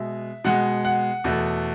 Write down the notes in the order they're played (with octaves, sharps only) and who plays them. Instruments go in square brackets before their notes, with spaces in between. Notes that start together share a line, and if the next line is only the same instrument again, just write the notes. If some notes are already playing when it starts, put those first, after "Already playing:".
Already playing: [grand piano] B2 G#3 E5
B2 G#3 F#5
F#5
E2 B2 A3